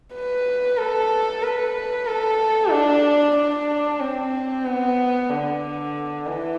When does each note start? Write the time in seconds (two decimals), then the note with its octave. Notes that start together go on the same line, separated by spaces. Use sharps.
0.13 B4
0.78 A4
1.42 B4
2.07 A4
2.72 D4
3.36 D4
4.01 C4
4.65 B3
5.30 D3
6.26 E3